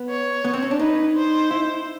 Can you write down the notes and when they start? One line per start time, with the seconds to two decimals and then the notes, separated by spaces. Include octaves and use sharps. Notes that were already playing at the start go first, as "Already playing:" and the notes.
Already playing: B3
0.10 C#5
0.45 B3
0.54 C4
0.62 C#4
0.71 D4
0.79 D#4 B4
1.16 C5
1.51 E4